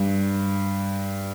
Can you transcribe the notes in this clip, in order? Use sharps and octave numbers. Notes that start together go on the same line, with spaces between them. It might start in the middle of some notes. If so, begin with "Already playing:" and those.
Already playing: G2